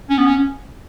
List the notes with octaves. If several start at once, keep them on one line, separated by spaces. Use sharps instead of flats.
C#4
B3
C#4